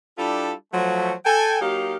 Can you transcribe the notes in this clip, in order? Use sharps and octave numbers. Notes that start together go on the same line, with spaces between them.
G3 D4 E4 F4 G4 A4
F3 F#3 A3
A4 G5 G#5
F#3 A#3 D#4 G4 F5